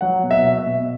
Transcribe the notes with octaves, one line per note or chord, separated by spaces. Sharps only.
F#3 F#5
B2
E5
B2
E5
B2